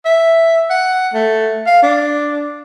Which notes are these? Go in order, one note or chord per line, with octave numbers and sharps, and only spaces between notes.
E5
F#5
A3
F5
D4